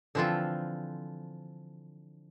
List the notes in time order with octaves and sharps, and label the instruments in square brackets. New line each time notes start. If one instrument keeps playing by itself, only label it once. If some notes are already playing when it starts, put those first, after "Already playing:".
[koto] D3 E3 F3 C4 F4 A4